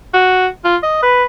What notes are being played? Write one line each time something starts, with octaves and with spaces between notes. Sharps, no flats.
F#4
F4
D#5
B4